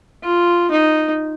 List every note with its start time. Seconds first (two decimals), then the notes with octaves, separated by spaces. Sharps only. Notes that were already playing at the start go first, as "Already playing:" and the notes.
0.23 F4
0.71 D#4